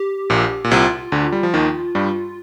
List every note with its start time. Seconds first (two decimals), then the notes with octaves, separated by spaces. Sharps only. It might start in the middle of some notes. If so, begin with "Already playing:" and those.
Already playing: G4
0.30 A#1 A#2
0.64 A#2
0.71 C2 C3 F4
1.12 D2 D3
1.32 G3
1.43 F3
1.54 D#2 D#3
1.95 G2 G3